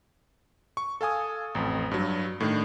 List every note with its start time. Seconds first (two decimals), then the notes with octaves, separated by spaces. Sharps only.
0.77 C#6
1.01 A4 F5 G#5 D#6
1.55 A1 F2
1.91 G2 F#3
2.40 A2 D#3 D4